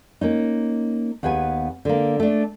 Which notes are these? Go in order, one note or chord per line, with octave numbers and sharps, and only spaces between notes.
A#3 C#4 D#4
D#2 B3 G#4 B4 G#5
D3 A#3
A3 D4